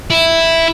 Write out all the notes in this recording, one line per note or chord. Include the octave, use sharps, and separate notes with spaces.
E4